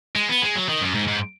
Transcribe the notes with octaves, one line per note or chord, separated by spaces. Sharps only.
G#3
B3
G#3
F#3
D#3
F#2
G#2
G#2